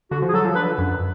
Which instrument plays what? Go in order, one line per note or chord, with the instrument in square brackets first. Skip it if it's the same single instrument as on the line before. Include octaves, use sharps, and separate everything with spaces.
[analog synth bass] D3 [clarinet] F#4
[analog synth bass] F3
[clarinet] G#4
[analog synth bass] F#3 [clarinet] A4
[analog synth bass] F3
[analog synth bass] D3 [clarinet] B4
[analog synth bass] F#2